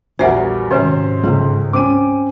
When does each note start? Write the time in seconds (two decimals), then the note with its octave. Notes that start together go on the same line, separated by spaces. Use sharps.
0.19 A#1 E2 G3 F#4 A#4 C5 E5 F#5
0.71 G#2 C3 D#3 G#3 C#4 C5 G#5
1.24 C#2 A4
1.73 C4 C#4 D6 D#7